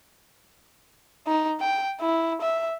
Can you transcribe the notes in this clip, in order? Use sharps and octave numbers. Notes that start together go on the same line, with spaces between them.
D#4
G5
E4
E5